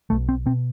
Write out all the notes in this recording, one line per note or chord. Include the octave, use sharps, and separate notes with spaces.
B1 B2 A3
C4
B2 C4